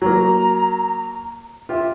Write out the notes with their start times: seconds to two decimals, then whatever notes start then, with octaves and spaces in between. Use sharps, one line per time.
0.02 F#3 A#3 A#5
1.69 F4 G4 E5